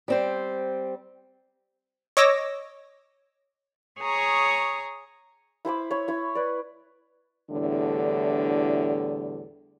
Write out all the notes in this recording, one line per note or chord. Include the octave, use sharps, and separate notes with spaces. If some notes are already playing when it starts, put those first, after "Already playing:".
G3 C4 C5
C#5 D#5 D6 E6 A#6
G#4 C#5 A#5 C#6 D#6
E4 C5 B5 D6
C#5 B5
E4 C#5
B4 D5
E2 A2 D3 G3 D4